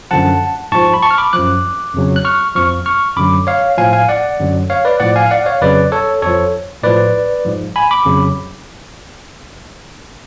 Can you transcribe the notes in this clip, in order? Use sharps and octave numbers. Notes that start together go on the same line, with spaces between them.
F#2 D3 F3 F#5 A5
G#2 F3 A5 C#6
B5
A5 C#6
F6
B5 D6
F#2 F3 D6 F#6
F2 C#3 F#3
F#6
C#6 F6
F2 F3 C#6 F6
C#6 F6
F#2 D3 F#3 B5 D6
C#5 F5
A2 F3 F5 G#5
F5 G#5
D5 F#5
F#2 D3 F#3
C#5 F5
B4 D5
A2 F3 D5 F#5
F5 G#5
F5
D5 F#5
C#5 F5
F2 C#3 F#3 B4 D5
A4 C#5
F2 F3 A4 C#5
A2 F3 B4 D5
G#2 F3
G#5 B5
B5 D6
F2 C#3 F#3